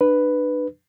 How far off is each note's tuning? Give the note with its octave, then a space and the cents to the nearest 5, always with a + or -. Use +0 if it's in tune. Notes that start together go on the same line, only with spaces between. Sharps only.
D4 +35 B4 +0